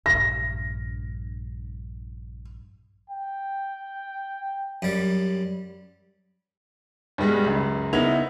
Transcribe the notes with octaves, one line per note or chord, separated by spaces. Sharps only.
A#1 G2 A#6
G5
F#2 G3
G2 B2 G3 G#3
C#2 F#2
F#1 B3 D#4 E4 G#6 F7